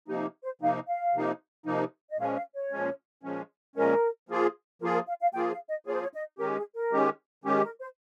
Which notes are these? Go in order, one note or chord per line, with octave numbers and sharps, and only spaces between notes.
C3 F3 A#3 D#4 G4
C5
C3 F3 A#3 D#4 F5
F5
C3 F3 A#3 D#4
C3 F3 A#3 D#4
D#5
A#2 F3 G#3 C#4 F5
F5
C#5
A#2 F3 G#3 C#4
A#2 F3 G#3 C#4
A#2 F3 G#3 C#4 A#4
F3 A#3 F4 G#4
F3 A#3 F4 G#4 A#4
A#4
F5
F5
F3 A#3 F4 G#4 G5
F5
D#5
F3 A#3 F4 G#4 C#5
C5
C#5
D#5
D#3 G#3 C#4 G4 A#4
G#4
A#4
D#3 G#3 C#4 G4
D#3 G#3 C#4 G4
A#4
C5